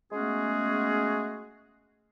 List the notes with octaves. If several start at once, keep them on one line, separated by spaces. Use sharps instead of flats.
G#3 A3 B3 C#4 F#4 G#4